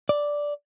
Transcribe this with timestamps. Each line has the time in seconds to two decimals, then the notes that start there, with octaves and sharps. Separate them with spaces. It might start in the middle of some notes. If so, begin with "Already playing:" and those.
0.09 D5